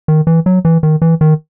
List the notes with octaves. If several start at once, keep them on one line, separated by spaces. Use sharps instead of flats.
D#3
E3
F#3
E3
D#3
E3
D#3